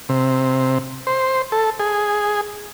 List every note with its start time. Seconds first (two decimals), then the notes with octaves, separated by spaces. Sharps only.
0.09 C3
1.07 C5
1.52 A4
1.80 G#4